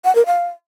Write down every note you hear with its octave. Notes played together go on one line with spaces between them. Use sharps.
F#5
A#4
F5